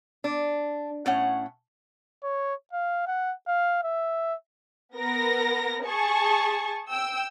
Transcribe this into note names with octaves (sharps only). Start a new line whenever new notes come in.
D4
A2 C#4 F#5
C#5
F5
F#5
F5
E5
B3 A#4 A#6
G#4 A5 C#6
G5 E6